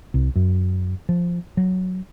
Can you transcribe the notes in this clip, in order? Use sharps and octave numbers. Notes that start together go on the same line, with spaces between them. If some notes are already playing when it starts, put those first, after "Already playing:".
C2
F#2
F3
F#3